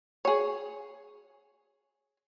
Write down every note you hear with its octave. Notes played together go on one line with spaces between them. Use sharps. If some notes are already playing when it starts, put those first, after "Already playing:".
G#4 C#5